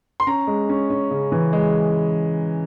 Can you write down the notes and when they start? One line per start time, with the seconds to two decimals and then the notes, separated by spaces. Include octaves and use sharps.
0.20 C6
0.27 C#4 A#5
0.47 G#3
0.69 C#4
0.90 C#4
1.11 C#3
1.32 E3
1.53 G#3